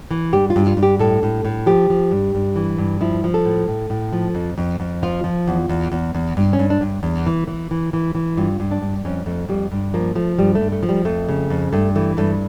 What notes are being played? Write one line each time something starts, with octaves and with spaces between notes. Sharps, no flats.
E3
G2 G4
F4
G2
F4
G2
G4
A2 A4
A2
A2
F3 G4
F3
G2
G2
E3
G2
F3 E4
F3
A4
A2
A2
A2
F3
F2
F2
F2
F3 F4
F3
E2
E2
E2
E2
G2
C#4
G2
D4
G2
E2
E3
E3
E3
E3
E3
G2 F4
G2
D4
G2
F2 C#4
F2 A3
F2 G3
G2
F3 A#3
F3 A3
G2 G3
A3
G2
A3
F3
G3
F2 A3
C#3
F2
G2 A3
E3 A3
G2 A3